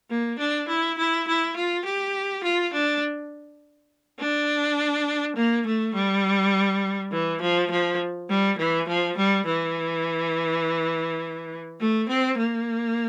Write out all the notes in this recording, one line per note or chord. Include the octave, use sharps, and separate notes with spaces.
A#3
D4
E4
E4
E4
F4
G4
F4
D4
D4
A#3
A3
G3
E3
F3
F3
G3
E3
F3
G3
E3
A3
C4
A#3